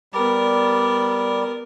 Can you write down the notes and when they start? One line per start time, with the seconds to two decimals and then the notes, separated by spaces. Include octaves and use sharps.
0.13 G3 B3 A#4 D5